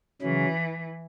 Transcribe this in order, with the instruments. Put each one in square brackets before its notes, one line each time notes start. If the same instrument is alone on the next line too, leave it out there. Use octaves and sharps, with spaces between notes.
[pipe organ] C#3 F#3 C#4 [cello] E3